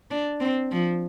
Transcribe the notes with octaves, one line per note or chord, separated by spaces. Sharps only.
D4
C4
F3